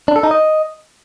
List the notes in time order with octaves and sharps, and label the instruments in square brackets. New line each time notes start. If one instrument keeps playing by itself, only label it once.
[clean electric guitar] D4
A4
D#4
D#5